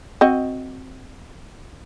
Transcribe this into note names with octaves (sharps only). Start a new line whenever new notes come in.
C4 F#4 D#5